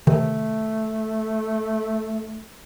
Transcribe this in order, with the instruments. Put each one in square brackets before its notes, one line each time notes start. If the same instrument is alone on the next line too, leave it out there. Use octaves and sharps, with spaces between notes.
[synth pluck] C3 D#3 [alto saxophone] A3